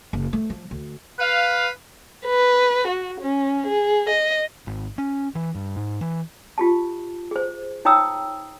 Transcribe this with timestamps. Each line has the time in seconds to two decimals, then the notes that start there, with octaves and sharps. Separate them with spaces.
0.13 F#1
0.33 A3
0.50 F3
0.71 D2
1.19 B4 F5
2.26 B4
2.87 F#4
3.20 C#4
3.67 G#4
4.09 D#5
4.67 G#1
4.98 C#4
5.35 E3
5.55 G2
5.76 G#2
6.01 E3
6.58 F4 G4 A5
7.31 G#4 C5
7.85 D#4 C#5 G5 A#5 D#6 E6